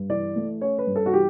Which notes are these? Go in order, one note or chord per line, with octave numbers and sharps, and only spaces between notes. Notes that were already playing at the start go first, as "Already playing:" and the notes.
Already playing: G2
E3 D5
A3
C#4 C#5
B4
G2
A4
F#4
E3 G4